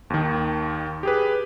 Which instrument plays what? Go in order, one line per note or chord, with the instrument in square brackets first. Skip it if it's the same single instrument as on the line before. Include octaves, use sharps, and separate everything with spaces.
[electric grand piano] D#2 D#3
G4 G#4 B4